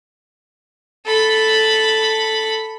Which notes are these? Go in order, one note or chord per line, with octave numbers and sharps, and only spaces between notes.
A4 B5